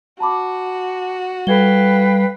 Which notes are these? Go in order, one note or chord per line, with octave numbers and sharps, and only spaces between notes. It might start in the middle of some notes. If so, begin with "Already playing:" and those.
F#4 A5 B5 D6
G3 A4 B4 F5 G5 G#6 G7